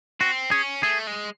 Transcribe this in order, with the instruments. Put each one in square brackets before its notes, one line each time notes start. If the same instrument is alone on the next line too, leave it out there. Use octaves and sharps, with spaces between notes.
[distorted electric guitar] C4 [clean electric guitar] F#4
[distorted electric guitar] C#4 [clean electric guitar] G#4
[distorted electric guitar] A3 [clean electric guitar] G#4
[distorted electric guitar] G#3